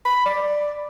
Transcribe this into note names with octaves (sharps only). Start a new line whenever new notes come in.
B5
D5